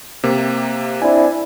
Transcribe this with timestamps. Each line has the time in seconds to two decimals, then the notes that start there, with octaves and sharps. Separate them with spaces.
0.24 C3 A#3
1.02 C4 D4 E4 G#5